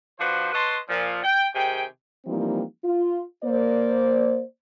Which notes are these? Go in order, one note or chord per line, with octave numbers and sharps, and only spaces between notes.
F3 D4 F#4 B4 C5
B4 C#5 D#5 A5 C6
A#2 F3
G5
C3 D#3 G#4 G5
E3 F3 G3 A#3 C4 D#4
F4
A#3 C5 D5